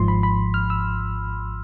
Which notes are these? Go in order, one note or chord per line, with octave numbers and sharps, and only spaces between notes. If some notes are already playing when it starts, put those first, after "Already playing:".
Already playing: G#1 G#2 F3 C6
B5
B5
F6
E6